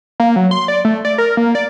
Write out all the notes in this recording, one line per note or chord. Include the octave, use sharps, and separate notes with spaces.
A#3
F#3
C6
D5
A3
D5
A#4
A#3
D5